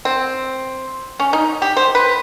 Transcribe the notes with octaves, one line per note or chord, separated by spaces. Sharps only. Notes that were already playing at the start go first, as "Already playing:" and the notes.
C4
C#4
D#4
G4
C5
B4